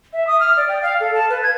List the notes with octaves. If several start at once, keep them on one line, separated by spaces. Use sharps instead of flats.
E5
D#6
F6
D5
G5
F5
A4
A5
B4
G#6